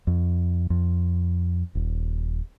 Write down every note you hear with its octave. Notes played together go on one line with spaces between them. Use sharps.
F2
F2
D#1